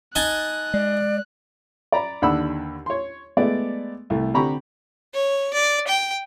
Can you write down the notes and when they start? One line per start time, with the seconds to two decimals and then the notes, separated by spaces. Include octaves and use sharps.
0.15 D#4 G#5 A5 F#6
0.74 G#3 D5
1.92 D5 A#5 B5
2.22 D#2 D3 D4 F#5 B5 E6
2.86 C#5 C6
3.37 G#3 A3 B3 D5
4.10 C2 A3
4.34 D3 C4 G4 A#5 B5 C#6
5.14 C#5
5.54 D5
5.88 G5